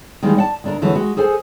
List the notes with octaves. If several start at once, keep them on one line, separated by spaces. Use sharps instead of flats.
D#3 E3 G3 G#3 A#3 D#4
D5 F#5 A5
D2 D4 A#4
E2 D3 E3 F#3 G#3
G#3 F#4
G#4 A4 C5 G#5